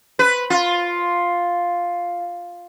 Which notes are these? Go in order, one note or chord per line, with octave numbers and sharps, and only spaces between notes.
B4
F4